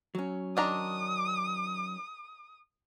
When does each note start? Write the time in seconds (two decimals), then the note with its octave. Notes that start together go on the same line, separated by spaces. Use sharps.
0.15 F#3 C#4
0.57 D#3 D4 A#5 D#6